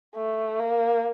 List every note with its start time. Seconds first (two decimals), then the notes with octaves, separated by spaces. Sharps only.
0.16 A3
0.59 A#3